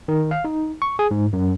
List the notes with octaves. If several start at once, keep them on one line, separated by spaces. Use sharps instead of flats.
D#3
F5
D#4
C#6
G#4
G#2
F#2